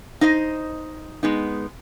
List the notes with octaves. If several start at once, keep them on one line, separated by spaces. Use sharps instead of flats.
D#4 C5 D#5
G#3 B3 D#4